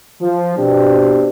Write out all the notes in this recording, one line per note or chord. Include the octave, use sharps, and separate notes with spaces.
F3
B2 C4 D4 G4